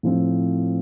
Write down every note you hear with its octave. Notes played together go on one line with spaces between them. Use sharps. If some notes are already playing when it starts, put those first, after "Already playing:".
A2 F3 C4